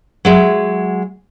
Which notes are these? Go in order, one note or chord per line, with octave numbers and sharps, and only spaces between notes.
F#3 G#3 E5